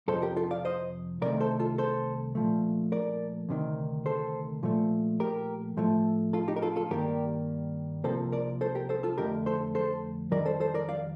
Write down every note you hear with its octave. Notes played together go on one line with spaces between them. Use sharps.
F2 C3 F3 A4 C5
G4 A#4
F4 A4
D5 F5
C5 D#5
C2 C3 D#3 A3 A#4 D5
A4 C5
F4 A4
A4 C5
A#2 F3 A3
A#4 D5
D2 C3 D#3
A4 C5
A#2 F3 A3
G4 A#4
A2 F3 A3
F4 A4
D#4 G4
A#4
F4 A4
F4 A4
G2 D#3 G3 A#3 G4 A#4
C2 C3 F3 A#3 A4 C5
A#4 D5
A4 C5
G4 A#4
A4 C5
F4 A4
F2 D3 A3 G4 A#4
A4 C5
A4 C5
F2 D#3 G3 A#4 D5
A4 C5
A4 C5
A#4 D5
D5 F5